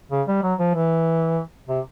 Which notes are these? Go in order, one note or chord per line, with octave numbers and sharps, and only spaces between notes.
C#3
G3
F#3
F3
E3
C3